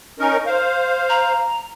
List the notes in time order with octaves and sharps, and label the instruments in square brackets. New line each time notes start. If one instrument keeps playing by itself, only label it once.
[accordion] C#4 D#4 A#4
C5 F5
[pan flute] A#5